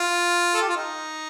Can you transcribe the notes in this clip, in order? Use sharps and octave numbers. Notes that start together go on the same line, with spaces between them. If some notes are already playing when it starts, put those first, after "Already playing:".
Already playing: F4
A4
G4
F4
D#4